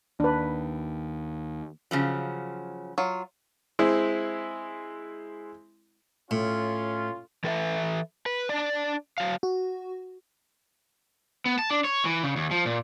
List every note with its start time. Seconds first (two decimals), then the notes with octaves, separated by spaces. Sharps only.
0.20 D#2 D4 B4
1.91 C#3 F3 F#3
2.98 F#3 F4
3.79 G#3 C4 E4
6.31 A2 C#4 F4
7.44 E3 A4 B4 D#5 E5
8.26 B4
8.49 D4 D5
9.18 F#3 F5
9.43 F#4
11.46 B3
11.59 A5
11.70 D4
11.84 C#5
12.05 E3
12.23 C#3
12.36 D#2
12.51 F3
12.66 A#2